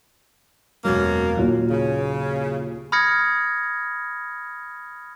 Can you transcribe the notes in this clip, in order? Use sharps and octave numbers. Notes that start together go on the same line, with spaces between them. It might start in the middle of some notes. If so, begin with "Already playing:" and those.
E1 F#2 B2 F#3 A#3
D#2 A#2 F#3
C#3
B5 D#6 F6 G#6 A#6 C#7